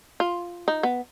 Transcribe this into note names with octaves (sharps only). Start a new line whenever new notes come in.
F4
D#4
B3